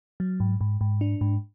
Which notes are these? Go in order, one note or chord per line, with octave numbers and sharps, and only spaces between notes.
F#3
G#2
G#2
G#2
D4
G#2